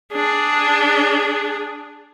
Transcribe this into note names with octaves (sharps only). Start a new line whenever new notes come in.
D4 G#4